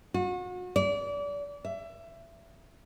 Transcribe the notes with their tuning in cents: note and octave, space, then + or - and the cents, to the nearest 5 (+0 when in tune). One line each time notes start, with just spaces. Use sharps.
F#4 -35
D5 -30
E5 +25